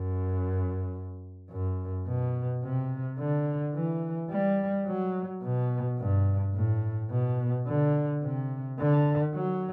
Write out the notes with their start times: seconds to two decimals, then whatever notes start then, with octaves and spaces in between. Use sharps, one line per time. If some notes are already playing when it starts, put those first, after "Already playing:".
Already playing: F#2
1.50 F#2
2.07 B2
2.63 C3
3.19 D3
3.75 E3
4.30 G3
4.87 F#3
5.43 B2
5.99 G2
6.55 A2
7.11 B2
7.67 D3
8.23 C3
8.79 D3
9.35 F#3